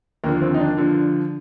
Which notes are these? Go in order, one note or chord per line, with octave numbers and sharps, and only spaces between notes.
D#2 D3 F3 A#3
C4
D#4
D4
D3 F3